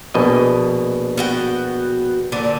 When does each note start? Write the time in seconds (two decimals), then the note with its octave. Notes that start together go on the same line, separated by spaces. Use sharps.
0.14 A#1 B2 D#5
1.17 B3 F#4 G5
2.32 A#2 D3 C4